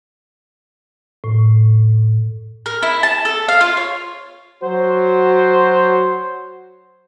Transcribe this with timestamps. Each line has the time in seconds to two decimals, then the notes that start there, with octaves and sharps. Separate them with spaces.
1.24 A2
2.66 A#4
2.82 E4
3.03 A5
3.25 A4
3.48 F5
3.61 F4
3.77 C#5
4.62 F#3 F#4 C5